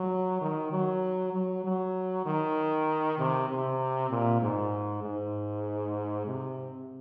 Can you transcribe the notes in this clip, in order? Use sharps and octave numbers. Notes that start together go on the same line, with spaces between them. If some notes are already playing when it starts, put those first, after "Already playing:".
Already playing: F#3
D#3
F#3
F#3
F#3
D#3
C3
C3
A#2
G#2
G#2
C3